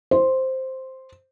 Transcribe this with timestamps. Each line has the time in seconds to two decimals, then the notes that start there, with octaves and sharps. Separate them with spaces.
0.11 C5